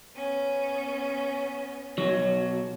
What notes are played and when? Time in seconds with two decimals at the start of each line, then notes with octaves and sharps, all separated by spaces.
0.14 B3 C#4
1.98 B1 F#3